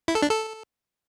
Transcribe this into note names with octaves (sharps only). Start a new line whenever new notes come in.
E4
A4
D4
A4